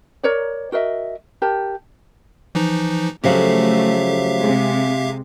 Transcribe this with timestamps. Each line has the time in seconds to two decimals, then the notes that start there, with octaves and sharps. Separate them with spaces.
0.23 A#4 C#5 D5
0.72 F#4 A#4 D#5 E5
1.42 G4 A#4 A5
2.55 E3 F3 D#4
3.24 C#3 F3 F#3 A3 G4 E5 F5
4.40 C3 G#3